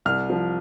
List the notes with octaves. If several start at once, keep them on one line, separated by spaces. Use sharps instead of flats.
C2 F6
F3